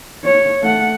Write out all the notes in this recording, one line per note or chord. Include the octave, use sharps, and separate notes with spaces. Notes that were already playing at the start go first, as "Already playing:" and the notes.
C#5
A3 F#5